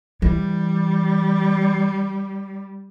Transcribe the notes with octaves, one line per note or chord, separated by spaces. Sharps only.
E3 G3